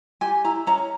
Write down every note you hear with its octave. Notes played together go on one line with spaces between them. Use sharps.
G4 G#5
E4 A#5
C#4 A#5